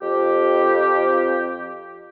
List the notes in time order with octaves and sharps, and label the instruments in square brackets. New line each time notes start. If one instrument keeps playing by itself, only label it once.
[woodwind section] F2 G4